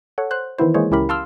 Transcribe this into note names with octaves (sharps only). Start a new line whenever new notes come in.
A4 C#5 F#5
C5 F#6
D#3 E3 B3 E4 C5
E3 G#3 A#3 G#4 C5 C#5
C#2 C#4 E4 G4 A#4 B5
F5 A5 C6 D6 E6 F6